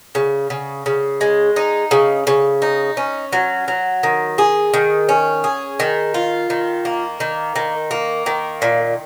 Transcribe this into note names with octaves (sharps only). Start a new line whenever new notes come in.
C#3
C#3
C#3
G#3
D#4
C#3
C#3
D#4
C#4
F#3
F#3
D#3
G#4
D#3
C#4
G#4
D#3
F4
D#3
A#3
D#3
D#3
A#3
D#3
A#2